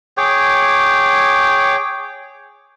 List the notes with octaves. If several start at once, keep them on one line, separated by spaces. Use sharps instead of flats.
G#4 C#5 G5 D6